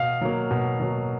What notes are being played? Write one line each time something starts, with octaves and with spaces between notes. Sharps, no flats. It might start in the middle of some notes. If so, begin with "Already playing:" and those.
Already playing: B2 F5
F#3 A#3
B2
F#3 A#3